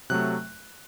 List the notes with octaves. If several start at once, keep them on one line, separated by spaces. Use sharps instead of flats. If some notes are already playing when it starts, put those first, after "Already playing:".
C3 F#3 A3 F#6